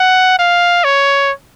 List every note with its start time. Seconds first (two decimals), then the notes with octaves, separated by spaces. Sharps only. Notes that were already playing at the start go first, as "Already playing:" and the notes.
Already playing: F#5
0.39 F5
0.84 C#5